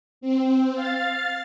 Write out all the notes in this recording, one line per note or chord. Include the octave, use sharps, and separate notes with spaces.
C4
F5 A6